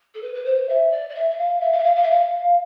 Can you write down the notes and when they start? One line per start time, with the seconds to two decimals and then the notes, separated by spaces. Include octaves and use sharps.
0.14 A4
0.22 B4
0.34 B4
0.45 C5
0.69 E5
0.91 D5
1.09 D5
1.15 E5
1.30 E5
1.38 F5
1.60 E5
1.72 F5
1.78 E5
1.84 F5
1.95 F5
2.03 E5
2.10 F5